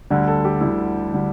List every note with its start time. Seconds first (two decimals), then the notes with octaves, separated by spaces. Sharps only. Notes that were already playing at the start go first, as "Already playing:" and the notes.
0.10 D2 D3 G3
0.27 A4
0.45 G4
0.61 D2 D3 G3 E4
1.13 D3 G3